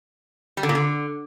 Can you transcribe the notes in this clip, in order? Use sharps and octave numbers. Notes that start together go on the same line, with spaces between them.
G3
D3
A#2
D3